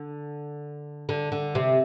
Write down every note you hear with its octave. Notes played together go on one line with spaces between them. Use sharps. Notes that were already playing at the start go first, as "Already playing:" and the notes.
Already playing: D3
D3
D3
C3